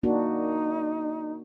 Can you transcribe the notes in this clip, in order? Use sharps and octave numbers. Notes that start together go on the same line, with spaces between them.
A#3 D4 D#4 F#4